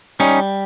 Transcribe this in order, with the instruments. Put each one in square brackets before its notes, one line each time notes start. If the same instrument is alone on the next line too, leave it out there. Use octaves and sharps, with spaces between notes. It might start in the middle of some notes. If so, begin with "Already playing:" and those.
[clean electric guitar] G3 C#4 D#4